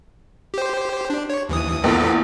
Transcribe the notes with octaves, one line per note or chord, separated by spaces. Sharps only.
G4 C5
D4
C#5
D#2 E3 D#6
A#1 E2 F4 A4 B4